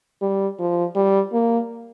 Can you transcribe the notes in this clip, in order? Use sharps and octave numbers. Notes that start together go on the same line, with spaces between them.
G3
F3
G3
A#3